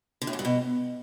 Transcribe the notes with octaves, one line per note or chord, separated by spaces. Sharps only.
D3
A2
G#2
G2
B2